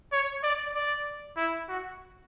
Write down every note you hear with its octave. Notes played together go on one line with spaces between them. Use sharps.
C#5
D5
D5
E4
F#4